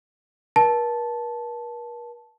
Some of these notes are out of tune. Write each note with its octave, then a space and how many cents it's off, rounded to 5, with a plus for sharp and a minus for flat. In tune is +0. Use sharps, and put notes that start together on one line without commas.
A#4 +45 A5 -10